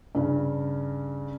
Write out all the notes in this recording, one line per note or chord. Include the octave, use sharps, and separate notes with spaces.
G2 C#3